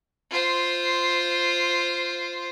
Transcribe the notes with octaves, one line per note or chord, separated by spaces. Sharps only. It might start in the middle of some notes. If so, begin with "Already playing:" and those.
F4 C5